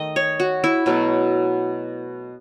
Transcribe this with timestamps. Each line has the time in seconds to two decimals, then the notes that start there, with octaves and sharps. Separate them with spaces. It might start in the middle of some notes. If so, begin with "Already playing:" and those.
Already playing: D#3 A3 D#5
0.16 C#5
0.40 F#4
0.64 E4
0.86 B2 F#3 A3